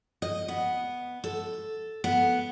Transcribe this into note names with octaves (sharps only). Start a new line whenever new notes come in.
D#5
B3
A4
B3